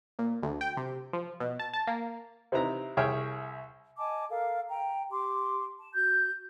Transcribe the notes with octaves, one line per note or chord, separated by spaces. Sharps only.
A#2
D2
G5
C3
F3
B2
A5
A5
A#3
C3 C4 D#4 E4 B4 A#5
C2 G#4 C#5 E5 G5 F6
D#5 G#5 A5 D6
A4 A#4 F5
G5 A#5
G4 C6 D6
A5
F#4 G6